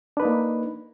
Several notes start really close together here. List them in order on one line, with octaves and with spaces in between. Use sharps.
D4 B4 D#4 A#3